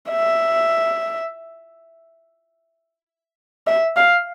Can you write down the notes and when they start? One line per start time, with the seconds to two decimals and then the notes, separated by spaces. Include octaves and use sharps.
0.11 E5
3.67 E5
3.97 F5